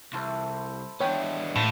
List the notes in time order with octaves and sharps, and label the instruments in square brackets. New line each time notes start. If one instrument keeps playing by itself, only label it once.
[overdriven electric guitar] C2 [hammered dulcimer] E4 A4 C5
[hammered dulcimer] E3 G#3 [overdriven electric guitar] B3 D4 [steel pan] C#5 G5
[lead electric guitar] A2 [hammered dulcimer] F4